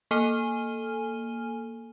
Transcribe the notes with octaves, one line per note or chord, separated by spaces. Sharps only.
A#3 A4 G#5 F6 D#7 G7